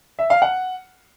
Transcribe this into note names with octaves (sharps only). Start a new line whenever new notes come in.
E5
F5
F#5